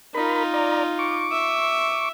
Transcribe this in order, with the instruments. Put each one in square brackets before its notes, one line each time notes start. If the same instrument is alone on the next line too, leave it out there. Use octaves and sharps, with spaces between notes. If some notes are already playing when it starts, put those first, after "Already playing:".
[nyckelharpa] D#4 F4 [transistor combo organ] A#4 B5
[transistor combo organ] D5 A#5
C#6 D6
[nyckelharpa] E5